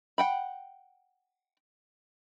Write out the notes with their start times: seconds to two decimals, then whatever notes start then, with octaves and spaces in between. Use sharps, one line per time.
0.18 F#5 G5 B5